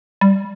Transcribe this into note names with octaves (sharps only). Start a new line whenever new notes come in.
G3